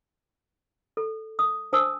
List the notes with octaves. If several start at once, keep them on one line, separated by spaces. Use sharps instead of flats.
A4
D#6
D4 C5 G#5 A5 D#6 E6